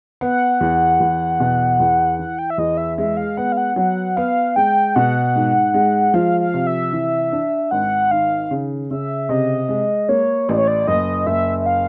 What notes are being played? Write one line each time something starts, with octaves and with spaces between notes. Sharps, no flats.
B3 F#5
E2
E2
B2
E2
E3 F#5
G5
E5
E2 D#5
E5
G#3 E5
F5
B3 F#5
F5
F#5
F#3 F#5
B3 F5
G#3 G5
B2 F#5
G#2
G#3
F3 F5
F5
C3
E5
E3
D4
G#1 F#5
D#3 F5
C#3
C#3 E5
C3 D#5
G#3
A#3 C#5
A1 D5
C#5
D5
F#1 D#5
F#1 E5
E5
F5